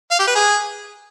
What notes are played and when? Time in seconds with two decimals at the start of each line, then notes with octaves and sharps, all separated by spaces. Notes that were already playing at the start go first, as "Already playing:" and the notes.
0.11 F5
0.19 G4
0.27 B4
0.35 G#4